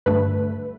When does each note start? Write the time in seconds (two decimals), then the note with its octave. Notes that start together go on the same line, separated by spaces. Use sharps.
0.06 G2 D3 A3 B4